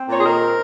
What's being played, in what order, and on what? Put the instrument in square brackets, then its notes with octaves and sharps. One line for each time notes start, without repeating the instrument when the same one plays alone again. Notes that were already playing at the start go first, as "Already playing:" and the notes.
Already playing: [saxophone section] C4
A#2 C#5
G#4
D#3 A#4
C4